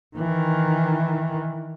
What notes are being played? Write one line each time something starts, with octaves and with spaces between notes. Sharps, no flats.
D#3 E3